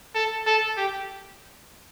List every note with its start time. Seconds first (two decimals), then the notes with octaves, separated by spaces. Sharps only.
0.15 A4
0.46 A4
0.77 G4